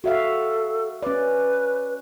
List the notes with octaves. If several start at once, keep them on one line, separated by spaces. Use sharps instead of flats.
F#4 A4 E5 F5
C#4 B4 D5